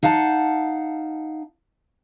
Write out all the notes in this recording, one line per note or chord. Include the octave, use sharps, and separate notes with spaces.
D#4 F5 F#5 A5